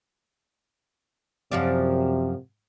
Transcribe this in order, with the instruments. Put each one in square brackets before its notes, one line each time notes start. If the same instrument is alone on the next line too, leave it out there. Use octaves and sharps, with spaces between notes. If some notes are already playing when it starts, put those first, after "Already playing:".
[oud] F#2 F3 D5 [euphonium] C3